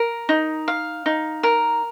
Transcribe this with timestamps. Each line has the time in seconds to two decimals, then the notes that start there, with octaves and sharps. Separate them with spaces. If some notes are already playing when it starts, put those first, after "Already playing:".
Already playing: A#4
0.29 D#4
0.68 F5
1.06 D#4
1.43 A#4